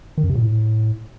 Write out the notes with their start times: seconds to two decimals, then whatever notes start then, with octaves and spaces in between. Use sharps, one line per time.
0.18 D#3
0.24 F#2
0.30 C3
0.36 A#2
0.42 A2